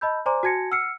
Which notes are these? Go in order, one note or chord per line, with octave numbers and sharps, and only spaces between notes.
D#5 A5 B5 E6 G6
C5 D5 G#5 A#5 C6 D6
F#4 G#5 A5 G#6 A#6 C#7
F#5 E6 F6 C7 C#7